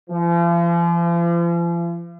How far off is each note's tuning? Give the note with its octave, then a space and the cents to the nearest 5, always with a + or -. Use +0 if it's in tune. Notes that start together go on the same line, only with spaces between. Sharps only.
F3 -40